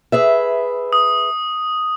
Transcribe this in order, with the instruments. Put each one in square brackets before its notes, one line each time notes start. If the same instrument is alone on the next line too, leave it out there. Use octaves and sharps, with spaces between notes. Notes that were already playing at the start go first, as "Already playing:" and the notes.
[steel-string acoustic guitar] G#4 B4 E5
[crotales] D#6